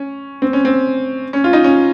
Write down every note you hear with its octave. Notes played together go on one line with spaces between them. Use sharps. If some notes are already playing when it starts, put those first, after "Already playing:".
Already playing: C#4
C4
C#4
C4
C#4
F4
D#4
C#4